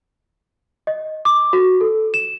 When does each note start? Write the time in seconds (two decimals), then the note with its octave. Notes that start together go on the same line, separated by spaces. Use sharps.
0.87 D#5
1.25 D6
1.53 F#4
1.81 A4
2.14 E7